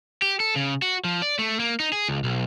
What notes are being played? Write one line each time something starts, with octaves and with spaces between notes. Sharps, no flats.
G4
A4
C#3
F#4
F3
D5
A3
A#3
D#4
G#4
C#2
B1